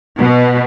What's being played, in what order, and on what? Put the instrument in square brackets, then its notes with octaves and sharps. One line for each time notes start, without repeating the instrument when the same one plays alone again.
[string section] B2